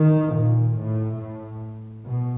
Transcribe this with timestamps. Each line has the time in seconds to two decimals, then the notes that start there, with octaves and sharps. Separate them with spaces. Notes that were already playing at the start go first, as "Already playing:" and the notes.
Already playing: D#3
0.34 A#2
0.78 A2
1.20 A2
2.06 B2